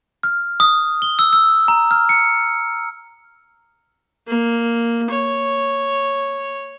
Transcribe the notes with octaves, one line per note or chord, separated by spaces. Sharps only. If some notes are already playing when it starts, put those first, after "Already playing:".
F6
D#6
G7
E6
E6
A#5
F6
C#7
A#3
C#5